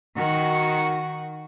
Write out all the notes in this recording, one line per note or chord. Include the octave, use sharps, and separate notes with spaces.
D#3 F#4